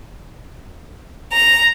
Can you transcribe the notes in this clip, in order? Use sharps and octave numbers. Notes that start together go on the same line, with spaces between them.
A#5